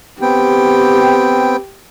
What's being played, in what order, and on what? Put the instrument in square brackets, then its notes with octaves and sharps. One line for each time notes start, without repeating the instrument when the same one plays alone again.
[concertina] B3 C4 G5 [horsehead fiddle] G4